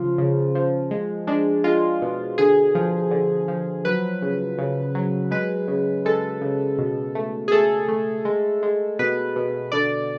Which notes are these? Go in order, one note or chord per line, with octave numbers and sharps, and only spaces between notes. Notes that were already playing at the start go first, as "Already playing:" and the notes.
Already playing: C#3 F3 F4
C#3
F3
G#3
G#3 D4
G#3 F4
B2
D3 G#4
F3
D3
F3
F#3 B4
C#3
C#3
F#3
G#3 B4
C#3
G#3 A4
C#3
B2
A3
G#4
A3 A4
A3
G#3
G#3
B2 B4
B2
D3 D5